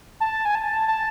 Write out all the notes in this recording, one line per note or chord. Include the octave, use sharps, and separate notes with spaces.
A5
G#5
A5
A5